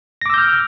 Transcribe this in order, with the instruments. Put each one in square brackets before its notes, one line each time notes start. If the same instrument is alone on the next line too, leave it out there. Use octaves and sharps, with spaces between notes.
[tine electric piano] A#6
D6
E6
G6
F6